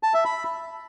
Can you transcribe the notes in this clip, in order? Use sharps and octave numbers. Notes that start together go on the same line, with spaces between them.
A5
E5
B5